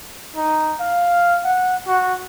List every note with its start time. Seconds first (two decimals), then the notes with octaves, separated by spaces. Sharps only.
0.36 D#4
0.80 F5
1.45 F#5
1.87 F#4